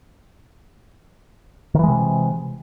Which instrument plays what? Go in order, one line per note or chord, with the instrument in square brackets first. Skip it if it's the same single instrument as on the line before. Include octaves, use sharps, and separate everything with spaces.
[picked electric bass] D#3
E3
G#3
C3